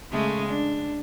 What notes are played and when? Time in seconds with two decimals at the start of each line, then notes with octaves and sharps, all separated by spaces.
0.12 C#3 G#3 A3
0.49 D4